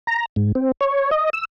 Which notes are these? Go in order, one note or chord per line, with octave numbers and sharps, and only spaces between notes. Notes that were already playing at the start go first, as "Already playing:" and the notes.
A#5
G#2
C4
C#5
D#5
E6